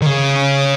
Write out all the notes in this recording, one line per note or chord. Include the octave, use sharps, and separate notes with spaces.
D#3
C#3